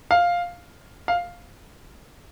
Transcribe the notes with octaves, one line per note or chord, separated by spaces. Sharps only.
F5
F5